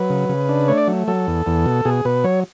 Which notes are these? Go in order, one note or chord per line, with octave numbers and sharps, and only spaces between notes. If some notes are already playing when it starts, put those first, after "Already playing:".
Already playing: F#3 B4
C#3
C#3
D4
A3 C#5
D5
F#3
F#3 A4
E2
E2
B2
B2 G#4
B2 B4
F#3 C#5